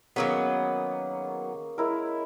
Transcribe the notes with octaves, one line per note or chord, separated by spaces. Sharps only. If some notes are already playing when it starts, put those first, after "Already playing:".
D#3 F#3 A#3 B3 C#4 G#4
G#3 E4 A#4